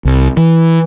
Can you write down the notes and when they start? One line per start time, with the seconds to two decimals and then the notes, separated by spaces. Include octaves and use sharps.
0.05 C2
0.37 E3